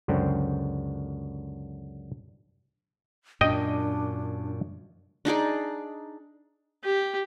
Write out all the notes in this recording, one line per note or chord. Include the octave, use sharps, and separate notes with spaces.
C#2 F#2 D3 C5 G5
F#2 A#2 D4 D#5 G5
D4 D#4 G#4 D5
G4